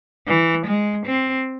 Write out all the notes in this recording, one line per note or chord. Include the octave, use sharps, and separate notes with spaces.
E3
G#3
C4